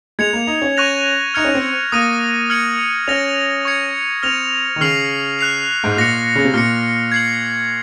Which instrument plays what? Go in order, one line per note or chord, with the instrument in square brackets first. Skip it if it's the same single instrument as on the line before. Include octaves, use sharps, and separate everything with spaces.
[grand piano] G#3 [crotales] G#6 C#7 F7
[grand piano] A#3
D#4
C#4
[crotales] C#6 F#6 A#6 F7
[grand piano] D#4 [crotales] F6 G#6 C#7
[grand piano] C#4
C4
[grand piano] A#3 [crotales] D#6 F#6 A#6 D#7
[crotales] F6 G#6 C#7 F#7
[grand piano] C#4 [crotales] F6 A#6 F7
[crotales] C#6 G#6 C#7
[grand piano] C4 [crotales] F6 A#6 F7
[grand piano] D#3
[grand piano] C#3 [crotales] C#6 F6 C7 F#7
[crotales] F#6 C7 F7
[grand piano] G#2
[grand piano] A#2 [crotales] F#6 A#6 C#7
[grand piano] C#3
C3
[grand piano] A#2 [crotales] F6 A#6 C#7
[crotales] G#6 C7 F#7